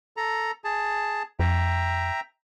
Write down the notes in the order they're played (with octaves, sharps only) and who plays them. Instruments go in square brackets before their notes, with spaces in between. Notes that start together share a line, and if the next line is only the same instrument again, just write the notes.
[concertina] A4 A#5
G#4 A5
[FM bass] F2 [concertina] E5 G5 A#5